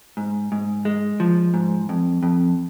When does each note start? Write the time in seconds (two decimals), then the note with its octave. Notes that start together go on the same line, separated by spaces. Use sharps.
0.17 G#2
0.52 G#2
0.85 G#3
1.20 F3
1.54 G#2
1.89 F2
2.23 F2